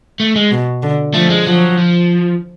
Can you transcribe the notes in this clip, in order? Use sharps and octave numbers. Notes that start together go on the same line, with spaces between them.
A3
G#3
B2
D3
F3 A3
G#3
F3 F#3
F3